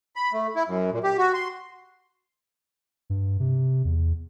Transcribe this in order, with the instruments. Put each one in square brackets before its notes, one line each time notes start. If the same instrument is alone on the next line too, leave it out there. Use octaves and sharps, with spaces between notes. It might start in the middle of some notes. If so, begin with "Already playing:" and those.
[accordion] B5
A3
E4
F#2
A#2
G4
F#4
C6
[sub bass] G2
C3
E2